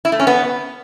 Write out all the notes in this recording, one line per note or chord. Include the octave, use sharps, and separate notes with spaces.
E4
A3
C#4
B3